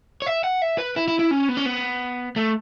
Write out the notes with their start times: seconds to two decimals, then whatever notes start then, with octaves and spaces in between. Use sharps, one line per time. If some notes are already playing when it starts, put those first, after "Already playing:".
0.22 C#5
0.26 E5
0.44 F#5
0.62 E5
0.78 B4
0.96 E4
1.08 E4
1.19 E4
1.31 C#4
1.49 B3
1.57 C#4
1.66 B3
2.36 A3